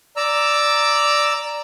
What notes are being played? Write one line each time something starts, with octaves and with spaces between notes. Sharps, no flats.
D5 A#5 E6